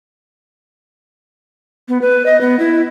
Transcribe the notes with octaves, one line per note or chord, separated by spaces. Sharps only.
B3
B4
D#5
B3
E4